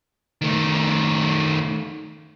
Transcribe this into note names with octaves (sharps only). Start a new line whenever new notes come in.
D#3 A3